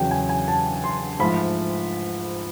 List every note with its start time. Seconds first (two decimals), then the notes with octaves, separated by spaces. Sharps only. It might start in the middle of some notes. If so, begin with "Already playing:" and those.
Already playing: E2 C#3 F#3 G5
0.11 G#5
0.29 G#5
0.48 A5
0.84 C6
1.19 G#2 F3 A3 B5